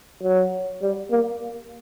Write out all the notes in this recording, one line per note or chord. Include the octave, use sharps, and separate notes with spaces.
F#3
G3
A#3